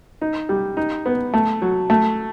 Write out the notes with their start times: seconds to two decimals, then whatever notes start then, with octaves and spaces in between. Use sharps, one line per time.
0.21 D#4
0.49 G3
0.77 D#4
1.06 B3
1.34 A3
1.62 F#3
1.90 A3